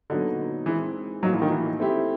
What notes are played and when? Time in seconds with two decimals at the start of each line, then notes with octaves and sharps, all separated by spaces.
0.10 A#2 D3 F#3 B3 D#4 F#4
0.66 D#3 E3 G#3 C4
1.22 A2 F3 F#3 A#3 D#4 F#4
1.33 E3
1.42 D#3
1.51 E3
1.80 A3 C4 E4 G4